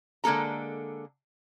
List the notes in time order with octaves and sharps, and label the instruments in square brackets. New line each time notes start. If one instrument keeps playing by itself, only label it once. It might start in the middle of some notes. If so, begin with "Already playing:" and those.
[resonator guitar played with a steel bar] D3 G#3 A#3 A4 A#5